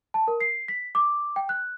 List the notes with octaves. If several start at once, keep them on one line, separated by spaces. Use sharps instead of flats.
A5
A#4
C7
B6
D6
G5
F#6